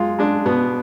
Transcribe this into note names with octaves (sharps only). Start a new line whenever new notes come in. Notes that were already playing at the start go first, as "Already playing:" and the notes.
Already playing: F#2 G#3 F4
G#3 D4
B2 B3